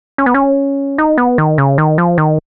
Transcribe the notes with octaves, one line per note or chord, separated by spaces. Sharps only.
C#4
B3
C#4
D#4
B3
D#3
C#3
D#3
F3
D#3